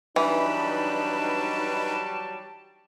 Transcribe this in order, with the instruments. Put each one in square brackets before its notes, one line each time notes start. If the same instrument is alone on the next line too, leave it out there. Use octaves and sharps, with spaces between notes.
[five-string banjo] E3 [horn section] F#3 G3 A5 [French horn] D4 [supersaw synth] D#4 B4 B5